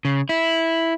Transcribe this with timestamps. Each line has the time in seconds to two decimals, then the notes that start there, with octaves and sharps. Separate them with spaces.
0.05 C#3
0.29 E4